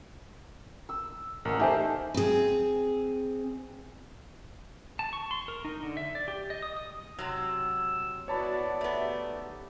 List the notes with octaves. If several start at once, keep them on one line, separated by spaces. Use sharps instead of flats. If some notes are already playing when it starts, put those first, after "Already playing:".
E6
A1 A#4 F#5
A3 D#4 G4 C5 E5 G#5
C4 G#4
A5
C#6
C6
A#4
D#4
D3
E5
D5
G4
D#5
D#6
D#6
C3 F#3 E6
B3 E4 F#4 C#5 D5 A5 B5
A3 B3 D#4 G4